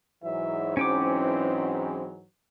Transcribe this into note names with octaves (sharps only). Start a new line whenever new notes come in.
G#2 E3 F#3 E5
C4 C#4 G5 D6